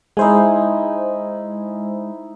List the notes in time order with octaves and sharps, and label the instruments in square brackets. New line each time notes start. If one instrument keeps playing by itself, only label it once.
[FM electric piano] G#3 C5 [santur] D#4 E4 G#5